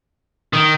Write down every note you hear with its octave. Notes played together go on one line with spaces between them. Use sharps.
D#3